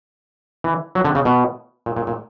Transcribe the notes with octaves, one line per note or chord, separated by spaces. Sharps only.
E3
F#3
D3
C#3
B2
A#2
A#2
A#2